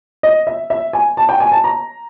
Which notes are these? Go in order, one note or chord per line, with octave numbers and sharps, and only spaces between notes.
D#5
E5
E5
G#5
A5
G5
G#5
A5
A#5